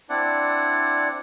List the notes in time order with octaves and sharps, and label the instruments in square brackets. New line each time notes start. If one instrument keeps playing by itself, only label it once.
[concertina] C4 D4 E4 D5 F#5